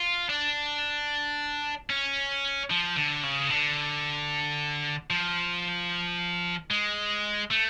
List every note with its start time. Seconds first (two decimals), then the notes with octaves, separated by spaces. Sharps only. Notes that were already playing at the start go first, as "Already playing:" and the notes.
Already playing: F4
0.29 D4
1.90 C#4
2.70 F3
2.96 D3
3.23 C#3
3.50 D3
5.10 F3
6.71 G#3
7.51 A3